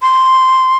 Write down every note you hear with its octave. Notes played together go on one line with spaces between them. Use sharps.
C6